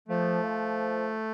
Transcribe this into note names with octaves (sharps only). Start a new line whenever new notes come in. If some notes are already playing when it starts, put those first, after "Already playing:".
F3 A3
F3